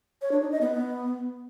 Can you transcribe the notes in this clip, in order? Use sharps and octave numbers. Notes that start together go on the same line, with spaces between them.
C#5
D4
D#4
D#5
B3